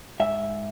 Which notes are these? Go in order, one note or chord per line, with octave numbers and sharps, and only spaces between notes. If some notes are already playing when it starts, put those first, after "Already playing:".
G#2 E5